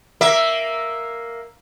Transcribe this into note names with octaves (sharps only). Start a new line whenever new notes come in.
A#3 E5